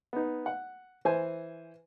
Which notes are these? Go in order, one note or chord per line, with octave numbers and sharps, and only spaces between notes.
B3 D#4
F#5
E3 C5 G#5